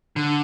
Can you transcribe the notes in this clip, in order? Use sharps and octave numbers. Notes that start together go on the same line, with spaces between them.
D3